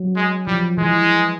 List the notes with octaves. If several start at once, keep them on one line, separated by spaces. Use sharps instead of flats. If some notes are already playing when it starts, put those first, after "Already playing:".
Already playing: F#3
G#3
F3 G3
E3 G#3